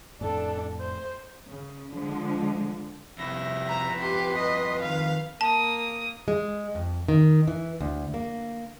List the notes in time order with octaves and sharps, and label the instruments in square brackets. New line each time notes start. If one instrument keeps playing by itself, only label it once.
[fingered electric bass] F2 A2 [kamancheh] D4 A4
[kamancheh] C5
[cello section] C#3
D3 F3 G#3
[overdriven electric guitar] F2 E4 [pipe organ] C3 E5 A#6
[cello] B4 [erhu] A#5
[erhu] G4 [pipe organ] C6
[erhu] D#5
[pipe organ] D#3 [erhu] F5
[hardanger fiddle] A#3 D#6 [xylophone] A5
[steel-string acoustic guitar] G#3
F2
D#3
E3
D2
A#3